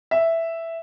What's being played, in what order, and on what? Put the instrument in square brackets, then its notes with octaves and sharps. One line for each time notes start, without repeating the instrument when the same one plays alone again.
[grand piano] E5